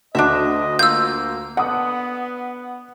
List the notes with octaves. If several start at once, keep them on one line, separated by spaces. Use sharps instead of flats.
D2 D4 F#4 D#5 E5
A#3 F4 E6 G6
D3 B3 F#5 D#6